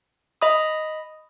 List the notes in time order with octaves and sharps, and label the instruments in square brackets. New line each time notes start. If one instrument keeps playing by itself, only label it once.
[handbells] D#5 B5 D#6